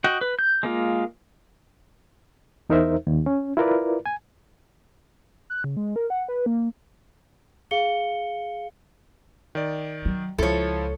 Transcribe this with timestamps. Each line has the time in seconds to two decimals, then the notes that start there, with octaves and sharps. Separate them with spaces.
0.04 F#4 D#5 F#5 G5
0.21 B4
0.39 G6
0.63 G#3 A#3 F4
2.69 E2 D#4 A#4 C5 E5
3.07 D#2
3.26 C#4
3.57 E4 F4 A#4 B4 D5
4.06 G#5
5.50 F#6
5.64 C#3
5.77 G#3
5.96 A#4
6.10 F#5
6.28 B4
6.46 A#3
7.71 G#4 F5 C#7 G7
9.55 D#3 D5
10.05 F#3
10.38 C#2 F3 E4 A4 C#5